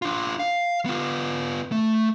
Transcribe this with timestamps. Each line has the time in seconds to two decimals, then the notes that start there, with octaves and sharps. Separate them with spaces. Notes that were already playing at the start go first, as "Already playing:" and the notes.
0.02 D4 F4
0.39 F5
0.86 B3 F4
1.72 A3